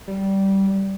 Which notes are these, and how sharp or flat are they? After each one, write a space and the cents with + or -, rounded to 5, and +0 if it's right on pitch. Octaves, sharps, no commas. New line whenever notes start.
G3 -15